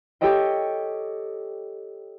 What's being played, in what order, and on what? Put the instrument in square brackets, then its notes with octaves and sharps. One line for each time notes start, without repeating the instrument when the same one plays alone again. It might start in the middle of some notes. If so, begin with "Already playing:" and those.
[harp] G4 A4 C#5 D#5 G5